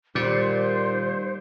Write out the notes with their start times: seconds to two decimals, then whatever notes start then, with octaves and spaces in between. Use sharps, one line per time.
0.15 A#2 D#3 G3 C5 D5